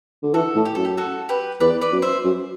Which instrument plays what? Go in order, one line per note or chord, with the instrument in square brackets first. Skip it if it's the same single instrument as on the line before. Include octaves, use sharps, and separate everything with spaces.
[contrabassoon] D3
[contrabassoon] E3 [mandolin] F#4 A4
[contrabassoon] A2
[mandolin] G4
[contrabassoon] F#2 [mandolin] A4
[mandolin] G4
F#4 A4
G4 B4
[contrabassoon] E2 [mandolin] B4 D5
[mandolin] B4 D5
[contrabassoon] F#2
[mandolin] C5 E5
[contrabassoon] F#2